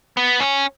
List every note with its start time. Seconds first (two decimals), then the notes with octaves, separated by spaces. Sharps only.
0.17 B3
0.40 C#4